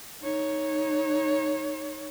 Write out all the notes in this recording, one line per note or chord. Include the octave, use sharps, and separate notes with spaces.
D#4 C#5